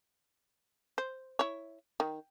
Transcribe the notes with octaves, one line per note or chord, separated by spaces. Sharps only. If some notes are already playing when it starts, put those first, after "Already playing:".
C5
E4 C#5
D#3